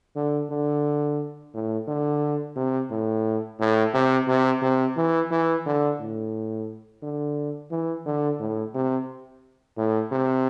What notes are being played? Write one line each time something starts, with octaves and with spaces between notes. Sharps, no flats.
D3
D3
A2
D3
C3
A2
A2
C3
C3
C3
E3
E3
D3
A2
D3
E3
D3
A2
C3
A2
C3